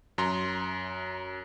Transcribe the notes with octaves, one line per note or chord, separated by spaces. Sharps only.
F#2 A#5 C6